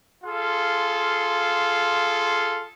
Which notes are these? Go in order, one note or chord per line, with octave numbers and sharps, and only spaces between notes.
F4 G#4 A4 F5 C6